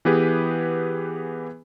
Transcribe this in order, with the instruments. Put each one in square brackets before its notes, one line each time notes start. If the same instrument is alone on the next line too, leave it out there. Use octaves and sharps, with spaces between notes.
[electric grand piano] E3 B3 G4 G#4 B4